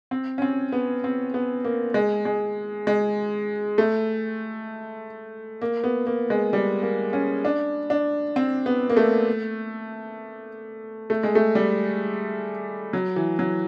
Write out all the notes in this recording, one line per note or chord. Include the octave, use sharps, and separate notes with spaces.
C4
C#4
C4
B3
C4
B3
A#3
G#3
G#3
G#3
A3
A#3
B3
A#3
G#3
G3
A#3
C#4
D4
D4
C4
B3
A#3
A3
A3
G#3
A3
G3
F#3
E3
F#3